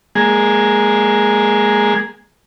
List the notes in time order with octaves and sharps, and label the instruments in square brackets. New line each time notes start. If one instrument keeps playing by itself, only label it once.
[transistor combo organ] G#3 A#3 G#4